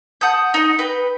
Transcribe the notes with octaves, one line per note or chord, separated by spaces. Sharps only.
F#5 A5 D#6 G6
D#4 D#5
B4 G5